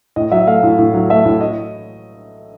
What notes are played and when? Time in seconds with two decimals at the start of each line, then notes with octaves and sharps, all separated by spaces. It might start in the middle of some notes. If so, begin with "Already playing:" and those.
0.16 A2 D#5
0.32 F#3 E5
0.47 A3 F5
0.63 A2
0.78 A2
0.94 F#3
1.10 A3 E5
1.25 A2
1.41 D#5